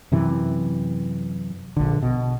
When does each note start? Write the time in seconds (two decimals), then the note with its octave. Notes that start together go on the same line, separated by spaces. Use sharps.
0.12 F#2 C3 E3
1.77 A#1 D3
2.02 B2